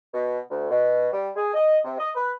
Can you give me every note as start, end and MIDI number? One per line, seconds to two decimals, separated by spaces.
0.13 0.39 47
0.50 0.69 38
0.70 1.08 47
1.12 1.28 55
1.35 1.53 68
1.54 1.78 75
1.84 1.97 48
1.98 2.10 75
2.15 2.31 71